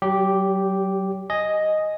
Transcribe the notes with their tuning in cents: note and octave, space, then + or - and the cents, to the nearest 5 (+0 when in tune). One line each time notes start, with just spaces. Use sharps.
F#3 +35 G4 -5
D#5 +0 G#5 +0